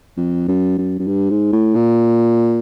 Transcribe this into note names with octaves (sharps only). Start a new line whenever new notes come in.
F2
F#2
F#2
F#2
G2
G#2
A2
A#2